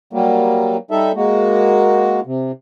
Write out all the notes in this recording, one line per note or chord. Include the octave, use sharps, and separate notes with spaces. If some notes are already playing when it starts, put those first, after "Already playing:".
F#3 G3 A#3
G3 D#4 A4 E5
G#3 A#3 F#4
C3